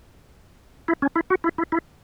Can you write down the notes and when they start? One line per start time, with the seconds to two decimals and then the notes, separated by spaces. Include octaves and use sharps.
0.88 E4
1.02 C#4
1.16 E4
1.30 F#4
1.44 E4
1.58 E4
1.72 E4